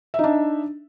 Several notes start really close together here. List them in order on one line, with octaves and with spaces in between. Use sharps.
E5 D#4 D4